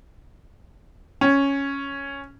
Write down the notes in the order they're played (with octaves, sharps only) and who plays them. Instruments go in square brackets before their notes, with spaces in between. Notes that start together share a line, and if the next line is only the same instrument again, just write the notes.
[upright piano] C#4